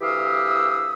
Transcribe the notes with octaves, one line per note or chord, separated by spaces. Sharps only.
D2 E3 G4 F5 D#6 E6